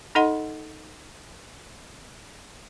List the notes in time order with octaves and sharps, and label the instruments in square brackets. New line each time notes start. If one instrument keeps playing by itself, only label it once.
[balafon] D#4 A4 D#5 F#5 C6